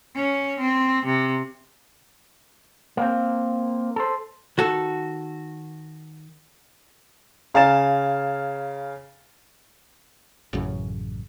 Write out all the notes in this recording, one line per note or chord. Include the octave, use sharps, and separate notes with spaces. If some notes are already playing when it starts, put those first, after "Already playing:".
C#4
C4
C3
A#3 C4
A4 C5
D#3 F#4 A4
C#3 F5 G#5 A#5 A6 E7
A1 F#2 C#3